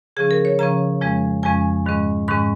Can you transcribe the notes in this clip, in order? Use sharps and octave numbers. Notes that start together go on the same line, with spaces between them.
C#3 F3 C#4 G#4
A#4
C#5
C#3 F3 C#4 A#5
F2 F3 G#3 C#4
F2 F3 G#3 C#4 G#5
G#2 D#3 G#3 C#4
G#2 D#3 G#3 C#4 C#6